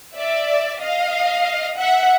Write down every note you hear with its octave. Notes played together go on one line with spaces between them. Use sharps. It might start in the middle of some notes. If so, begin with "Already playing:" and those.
D5 E5
D#5 F5
E5 F#5